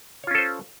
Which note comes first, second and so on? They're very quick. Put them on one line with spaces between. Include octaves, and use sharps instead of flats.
C#5 F4 C#4 A4 C5